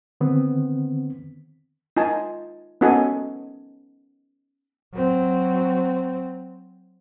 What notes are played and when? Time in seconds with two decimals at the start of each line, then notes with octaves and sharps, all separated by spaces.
0.21 D3 D#3 B3 C4
1.97 D#4 F4 G#5 A5
2.81 B3 C#4 D#4 F#4 A4 G#5
4.93 F#3 C4